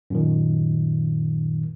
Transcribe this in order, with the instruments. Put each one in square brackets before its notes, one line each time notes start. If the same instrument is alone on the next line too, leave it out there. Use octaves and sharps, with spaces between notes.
[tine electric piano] F#2 A#2 D#3